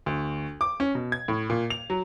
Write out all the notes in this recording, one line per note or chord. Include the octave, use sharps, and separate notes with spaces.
D2
D6
C#4
B2
G#6
A2
A#2
F7
F#3